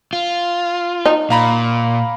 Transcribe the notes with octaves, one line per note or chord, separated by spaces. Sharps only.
F4
D#4
A#2 F5 A#5 B5